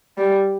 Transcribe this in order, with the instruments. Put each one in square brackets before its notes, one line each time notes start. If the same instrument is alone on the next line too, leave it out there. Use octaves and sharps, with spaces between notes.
[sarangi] G3